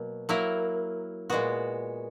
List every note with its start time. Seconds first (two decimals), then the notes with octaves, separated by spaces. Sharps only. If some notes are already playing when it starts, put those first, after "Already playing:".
Already playing: B2 F#3 A#3
0.29 F#3 A#3 E4 A#4
1.30 A#2 G#3 B3 F#4